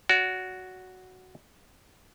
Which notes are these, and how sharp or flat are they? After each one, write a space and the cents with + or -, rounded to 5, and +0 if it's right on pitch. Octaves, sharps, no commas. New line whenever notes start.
F#4 +0 D5 -45